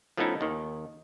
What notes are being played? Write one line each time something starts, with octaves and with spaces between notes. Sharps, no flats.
F3 A3 B3 C#4 D#4 E4
D#2 D#3